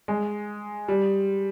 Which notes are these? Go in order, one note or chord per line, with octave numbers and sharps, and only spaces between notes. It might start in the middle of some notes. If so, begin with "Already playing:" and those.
G#3
G3